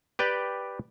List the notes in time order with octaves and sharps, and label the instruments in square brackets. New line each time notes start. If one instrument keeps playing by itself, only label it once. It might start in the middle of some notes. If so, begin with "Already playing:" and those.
[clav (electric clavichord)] G4 B4 D5 G5